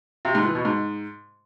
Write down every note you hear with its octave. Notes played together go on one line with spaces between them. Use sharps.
C3
G#2
E3
B2
G#2